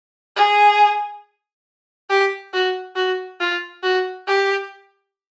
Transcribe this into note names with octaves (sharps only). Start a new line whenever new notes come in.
G#4
G4
F#4
F#4
F4
F#4
G4